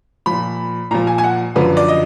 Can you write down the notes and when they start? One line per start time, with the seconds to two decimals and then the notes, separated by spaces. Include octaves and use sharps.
0.26 A#2 F3 B5
0.91 A#2 F3 A#5
1.07 G#5
1.18 G#5
1.24 F#5
1.55 F#2 D3 F3 B4
1.77 D5
1.88 D#5